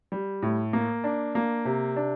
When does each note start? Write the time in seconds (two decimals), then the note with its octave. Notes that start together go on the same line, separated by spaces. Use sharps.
0.12 G3
0.42 A2
0.73 A#3
1.04 D4
1.35 A#3
1.65 C3
1.96 D4